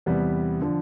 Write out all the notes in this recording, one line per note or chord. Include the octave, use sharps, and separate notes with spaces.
E2 C3 G3 B3
D3 F3